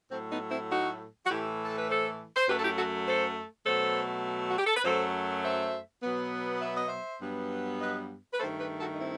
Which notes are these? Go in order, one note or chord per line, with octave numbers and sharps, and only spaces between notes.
A2 F#3 A3 C4
B3 D#4
C4 E4
D#4 F#4
F#4
A2 E3 A3 E4 G4
A4
B4
A4 C5
C5
F#2 F#3 A3 G4 B4
A4
E4 G4
F#4 A4
A4 C5
B2 F#3 A3 A4 C5
F#4
G4
A4
B4
F#2 F#3 A3 A4 C5
C5 E5
B2 F#3 B3
E5
D#5
C5 E5
G2 F#3 B3
B4 D#5
B4
G2 D#3 A3 A4 C5
G4 B4
F#4 A4
D#4
C4 E4